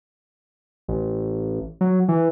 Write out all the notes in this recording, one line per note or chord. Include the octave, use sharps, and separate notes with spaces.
A1
F#3
E3